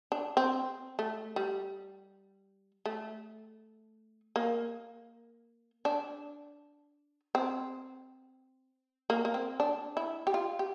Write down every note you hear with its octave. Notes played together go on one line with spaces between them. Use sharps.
D4
C4
A3
G3
A3
A#3
D4
C4
A#3
A#3
C4
D4
E4
G4
F4
G4